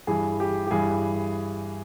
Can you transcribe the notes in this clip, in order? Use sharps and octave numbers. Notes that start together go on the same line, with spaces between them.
G2 E3 G#4
G4
G4
G2 E3 G#4